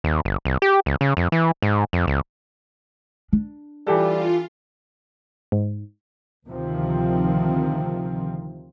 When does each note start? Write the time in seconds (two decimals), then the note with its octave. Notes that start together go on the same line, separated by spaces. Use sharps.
0.04 D#2
0.25 G1
0.45 C2
0.62 G4
0.86 C#2
1.01 C#3
1.17 F2
1.32 E3
1.62 G#2
1.93 F2
2.07 C#2
3.33 D4
3.87 E3 G3 F4 G4 A4
5.52 G#2
6.47 D2 C3 D#3 F3 C4